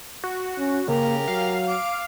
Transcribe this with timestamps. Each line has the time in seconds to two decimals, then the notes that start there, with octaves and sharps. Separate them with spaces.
0.24 F#4
0.58 C#4
0.88 C#3 A#3 G4 A#4
1.28 F#3 F5
1.68 D6